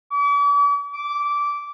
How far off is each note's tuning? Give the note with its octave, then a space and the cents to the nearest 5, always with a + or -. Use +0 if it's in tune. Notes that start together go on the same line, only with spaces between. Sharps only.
D6 -45
D6 -15